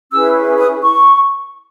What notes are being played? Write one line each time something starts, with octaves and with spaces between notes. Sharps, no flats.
C#4 E4 G#4 B4 E6
D#6
C#6